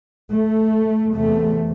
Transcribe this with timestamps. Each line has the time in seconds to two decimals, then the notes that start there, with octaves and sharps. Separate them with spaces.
0.32 A3
1.14 E2 C3 A3